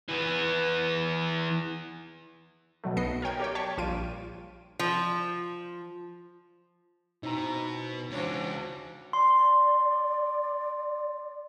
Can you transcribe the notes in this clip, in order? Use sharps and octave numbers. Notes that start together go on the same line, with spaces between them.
E3 B3
B2 F#3 A3
B1 B3 D#5 C7 C#7
A#4 C#5 G5 G#6
G4 C#5 G5
C#5 A5 C#6 B6
A#1 G3 F4 D7 D#7
F3
B2 C4 D#4 E4 A#5
C#2 E3 C4 D4 F#4 C#5
D5 C6